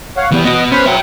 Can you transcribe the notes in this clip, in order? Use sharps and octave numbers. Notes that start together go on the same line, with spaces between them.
C#5 F5 F#5
E3 G3 B3
B3 F#4 D#5
C#4 B4 C5 B5
F#3 E5 G5